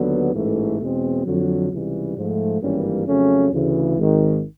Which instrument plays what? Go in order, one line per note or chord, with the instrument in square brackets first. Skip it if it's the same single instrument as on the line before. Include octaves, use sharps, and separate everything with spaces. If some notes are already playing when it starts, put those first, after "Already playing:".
Already playing: [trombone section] D#2 D3 F#3 B3
A1 G#2 E3 A3
E2 B2 G#3 C4
F2 D3 F#3
C#2 C3 E3 G3
G#2 F3 A3
G#1 G2 E3 G3 A#3 C#4
F2 C#3 F#3 A3 C#4
D2 C#3 E3
G#1 G#2 D#3